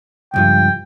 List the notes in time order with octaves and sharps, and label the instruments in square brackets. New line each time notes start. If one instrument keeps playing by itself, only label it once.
[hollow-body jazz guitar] C#2 G2 F3 [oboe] G5